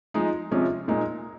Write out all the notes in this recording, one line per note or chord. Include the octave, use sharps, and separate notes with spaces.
F3 G#3 D#4
C3 F3 G#3 C#4
A#2 G#3 D#4